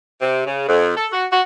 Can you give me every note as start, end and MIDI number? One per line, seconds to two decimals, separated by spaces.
0.21 0.45 48
0.47 0.66 49
0.69 0.95 41
0.96 1.07 69
1.12 1.26 66
1.31 1.41 66